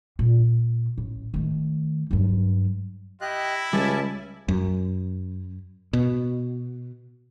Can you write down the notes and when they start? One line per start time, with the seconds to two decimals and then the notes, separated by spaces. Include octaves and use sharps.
0.19 A#2
0.98 A1
1.34 D#3 A3
2.11 G2 F#3
3.21 E4 G4 D#5 F#6
3.73 C#2 G3 E5 G#5 A5
4.48 F#2
5.93 B2